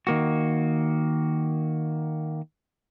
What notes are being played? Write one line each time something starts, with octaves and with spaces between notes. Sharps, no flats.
D#3 A#3 F#4